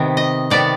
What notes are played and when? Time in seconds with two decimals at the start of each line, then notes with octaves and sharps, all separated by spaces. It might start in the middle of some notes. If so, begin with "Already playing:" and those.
Already playing: C3 D#3 B3
0.17 D#5
0.50 C3 D#3 B3 D5